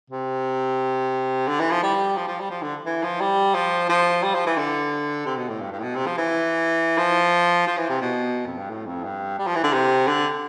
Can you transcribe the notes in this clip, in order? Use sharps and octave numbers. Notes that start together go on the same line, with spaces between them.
C3
D3
E3
F3
G3
F3
F3
G3
F3
D3
E3
F3
G3
F3
F3
G3
F3
E3
D3
C3
B2
A2
G2
G2
A2
B2
C3
F3
E3
F3
F3
E3
C3
B2
F2
G2
A2
F2
G2
G3
F3
E3
D3
C3
D3